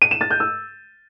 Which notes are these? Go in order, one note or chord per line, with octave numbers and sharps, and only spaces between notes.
D#7
E7
A6
G6
E6